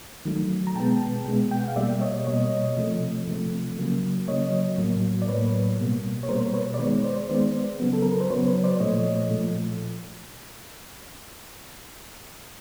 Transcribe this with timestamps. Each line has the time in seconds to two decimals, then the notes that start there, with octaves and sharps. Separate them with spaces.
0.25 D#3 F#3 A3
0.67 A#5
0.76 B2 G#3 B3 G5 A5
1.26 B2 G#3 B3
1.51 G5
1.60 F#5
1.68 F5
1.76 B2 G3 A#3 D5 E5
2.01 C#5 D#5
2.27 B2 G3 A#3 C#5 D#5
2.77 C3 F3 A3
3.28 C3 F3 A3
3.78 C#3 F#3 A#3
4.28 C#3 F#3 A#3 C#5 D#5
4.78 A2 F#3 A#3
5.22 D5
5.28 A2 F#3 A#3 B4 C#5
5.79 B2 G3 A#3
6.23 C#5
6.29 B2 G3 A#3 A#4 C5
6.54 B4 C#5
6.74 D5
6.79 D#3 G#3 B3 B4 C#5
7.04 C5 D5
7.29 D#3 G#3 B3 C5 D5
7.80 C#3 F#3 B3
7.93 A4
8.02 A#4
8.11 B4
8.21 C5
8.30 C#3 F#3 B3 B4 C#5
8.47 B4 C#5
8.64 C5 D5
8.80 A#2 F3 A3 C#5 D#5
9.31 A#2 F3 A3